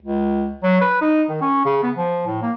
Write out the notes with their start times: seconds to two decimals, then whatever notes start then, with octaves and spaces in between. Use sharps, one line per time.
0.02 C#2
0.63 F#3
0.81 B4
1.01 D#4
1.29 D#3
1.41 C#4
1.65 C#3
1.83 B3
1.96 F3
2.27 A2
2.42 A#3